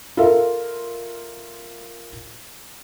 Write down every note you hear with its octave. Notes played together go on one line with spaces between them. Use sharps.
F4 A4 A#4 E5 F5